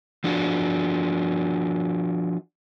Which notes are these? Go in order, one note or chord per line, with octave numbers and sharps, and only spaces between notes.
F3 D4 F#4